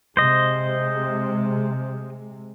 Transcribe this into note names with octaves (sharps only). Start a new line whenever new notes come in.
C3 G#3 C5 D#5